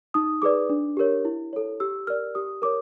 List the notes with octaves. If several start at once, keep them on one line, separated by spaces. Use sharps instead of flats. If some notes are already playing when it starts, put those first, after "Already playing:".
D#4 D#6
G#4 B4 D5 D6
D4
G4 A#4 C#5
E4
A4 C#5
G4 E6
A#4 D5 F6
G4 D#6
A#4 C#5 D6